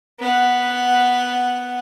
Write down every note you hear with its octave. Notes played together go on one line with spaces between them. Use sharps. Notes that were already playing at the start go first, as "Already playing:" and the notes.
B3 F#5